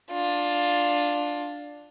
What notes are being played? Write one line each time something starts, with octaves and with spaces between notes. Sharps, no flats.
D4 F4